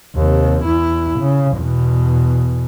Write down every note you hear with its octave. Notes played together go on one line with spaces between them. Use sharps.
D#2 C3
E2 E4
C#3
E2 B2